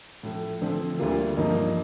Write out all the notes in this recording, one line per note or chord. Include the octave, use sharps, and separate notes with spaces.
A2 F3 A3
D3 F3 A3 C4
D2 D3 G3 A#3 F4
G2 F3 A#3 D#4